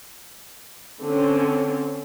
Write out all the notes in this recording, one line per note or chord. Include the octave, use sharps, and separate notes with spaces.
D3 C4 C#4